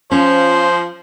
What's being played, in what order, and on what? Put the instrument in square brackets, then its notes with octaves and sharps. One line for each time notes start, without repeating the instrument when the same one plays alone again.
[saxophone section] F3 [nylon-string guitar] C#4 [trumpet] C5